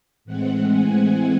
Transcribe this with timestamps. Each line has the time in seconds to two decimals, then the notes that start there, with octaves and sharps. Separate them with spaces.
0.25 A2 E3 G#3 C4 F#5
0.72 G#5